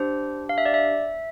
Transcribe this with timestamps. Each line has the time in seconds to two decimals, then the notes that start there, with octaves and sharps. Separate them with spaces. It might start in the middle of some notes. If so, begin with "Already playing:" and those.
Already playing: D4 G4 C5
0.49 F5
0.58 E5
0.66 D5
0.74 E5